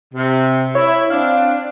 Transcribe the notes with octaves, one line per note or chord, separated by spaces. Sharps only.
C3
E4 C#5
C4 D4 F5